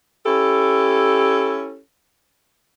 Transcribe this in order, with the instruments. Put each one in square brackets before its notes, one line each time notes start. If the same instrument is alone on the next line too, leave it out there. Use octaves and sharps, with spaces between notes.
[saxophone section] C#4 E4 G4 A4